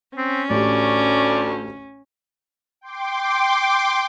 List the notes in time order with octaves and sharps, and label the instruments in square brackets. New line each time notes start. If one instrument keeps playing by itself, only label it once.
[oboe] C4 [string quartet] C#4
[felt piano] A1 G4 [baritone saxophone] D2 [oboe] D5
[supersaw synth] G5 C6 D6